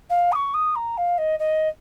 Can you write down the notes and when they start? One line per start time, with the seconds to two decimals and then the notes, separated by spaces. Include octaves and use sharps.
0.10 F5
0.32 D#6
0.35 C#6
0.54 D#6
0.76 A#5
0.97 F5
1.18 D#5
1.39 D#5